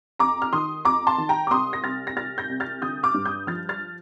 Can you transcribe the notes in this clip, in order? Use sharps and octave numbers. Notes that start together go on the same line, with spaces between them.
F2 A#5 D6
F6
D#3 C6 D#6
F2 A#5 D6
A5 C6
D#3
G5 A#5
D6
C2 C6 D#6
A#6
C2 F6 A6
A#6
C2 F6 A6
G6 A#6
C2
F6 A6
D3 D#6 G6
D6 F6
G2
D#6 G6
F3 F6 A6
F6 A6